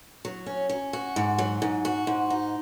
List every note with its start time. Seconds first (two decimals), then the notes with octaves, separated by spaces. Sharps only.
0.25 F#3
0.46 C#4
0.70 C#4
0.93 F#4
1.16 G#2
1.38 F#3
1.62 G#2
1.85 F#4
2.07 G#2
2.30 D#4